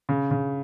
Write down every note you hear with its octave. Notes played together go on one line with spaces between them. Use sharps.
C#3
C#3